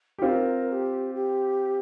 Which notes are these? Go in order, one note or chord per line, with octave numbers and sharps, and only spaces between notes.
G4
C4 F4 A#4
A#4
G4
G4